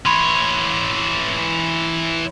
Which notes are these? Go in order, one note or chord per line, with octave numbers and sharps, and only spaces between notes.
E3 C#5 B5 C6